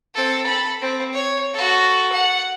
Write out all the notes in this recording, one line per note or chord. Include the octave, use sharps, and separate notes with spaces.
C4 A4
A4 B5
C4
C#5
F#4 A4
F#5